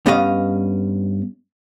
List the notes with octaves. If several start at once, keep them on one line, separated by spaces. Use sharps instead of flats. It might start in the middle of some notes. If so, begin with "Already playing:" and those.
G2 B3 C#4 D#5 F5